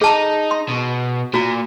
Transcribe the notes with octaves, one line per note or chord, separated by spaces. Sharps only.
D#4 G#4 A5 A#5
C6
B2
A#2 F#4 A#5